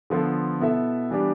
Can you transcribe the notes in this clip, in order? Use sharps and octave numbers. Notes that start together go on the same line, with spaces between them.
D3 F3 B3 F4 A4
B2 B3 E4 A4 E5
E3 G3 B3 D4 G4